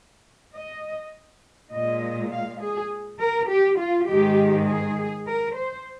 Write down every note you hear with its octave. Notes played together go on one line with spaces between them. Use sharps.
D#5
A#2 G#3 D#5
F5
G#4
A#4
G4
F4
G#2 D#3 G#3 G4
G#4
A#4
C5